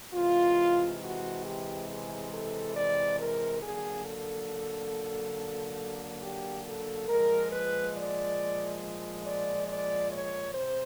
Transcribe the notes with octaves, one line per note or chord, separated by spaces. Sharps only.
C3 E3 G#3 F4
F#4
G4
G#4
A4
D5
A#4
D3 F#3 A#3 G#4
A4
G4
A4
A#2 F3 G#3 A#4
B4
D5
D5
D5
C#5
C3 C5